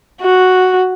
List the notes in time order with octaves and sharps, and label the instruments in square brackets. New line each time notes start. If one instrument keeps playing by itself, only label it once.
[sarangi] F#4